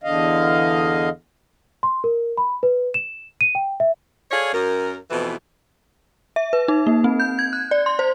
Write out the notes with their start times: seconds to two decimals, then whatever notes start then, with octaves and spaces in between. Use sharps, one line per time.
0.04 E2 D3 D#5 F5
1.83 C6
2.04 A#4
2.37 B5
2.63 B4
2.94 E7
3.41 D#7
3.55 G5
3.80 E5
4.31 G#4 A4 C#5 D5 F5
4.53 F#2 A#4
5.10 F2 B2 E3
6.36 E5
6.53 B4
6.68 D#4
6.87 A#3
7.04 C4
7.20 G6
7.39 G#6
7.53 F#6
7.71 D5
7.86 C6
7.99 C5